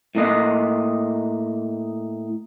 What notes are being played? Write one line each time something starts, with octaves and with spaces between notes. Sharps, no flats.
A2 A#3 D#5